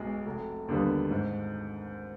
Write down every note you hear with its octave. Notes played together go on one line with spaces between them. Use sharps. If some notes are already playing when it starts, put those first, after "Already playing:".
Already playing: B1 B2 G#3
F1
D#2 D3 G3 B3
G#2